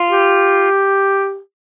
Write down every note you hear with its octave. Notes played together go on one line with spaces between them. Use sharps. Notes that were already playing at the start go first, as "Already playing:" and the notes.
Already playing: F4
G4